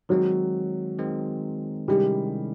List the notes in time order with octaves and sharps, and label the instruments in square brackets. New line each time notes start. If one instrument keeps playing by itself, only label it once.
[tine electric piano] D#3 G#3 C4 [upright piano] F#3
[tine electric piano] D#3 G#3 C4
[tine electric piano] C3 D#3 G#3 C#4 E4 [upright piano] G3